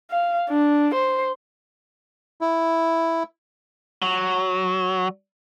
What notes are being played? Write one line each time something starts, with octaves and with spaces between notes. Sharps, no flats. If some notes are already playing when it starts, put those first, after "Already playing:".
F5
D4
C5
E4
F#3